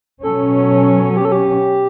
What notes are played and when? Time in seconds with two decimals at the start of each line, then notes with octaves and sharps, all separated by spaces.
0.23 B2 F#3 C#4 A4
1.17 G4
1.25 A4
1.32 G4